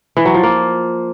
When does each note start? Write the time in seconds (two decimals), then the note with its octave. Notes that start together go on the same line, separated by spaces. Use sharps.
0.17 E3
0.25 F#3
0.34 F3
0.43 A#3